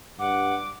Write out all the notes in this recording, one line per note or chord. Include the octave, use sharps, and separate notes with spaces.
G2 F#5 D6